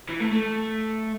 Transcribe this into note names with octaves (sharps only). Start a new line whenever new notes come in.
E3
A3
A3